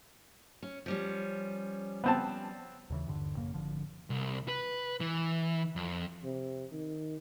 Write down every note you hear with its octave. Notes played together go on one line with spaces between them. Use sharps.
C#4
F3 G3 C#4
B3 C4 A5
D#2 C#3 E3
D#1 G2 D3
A1 F#2 C#3 A#3
G#1 D3 F3
C2
B4
E3
F2
C3
D#3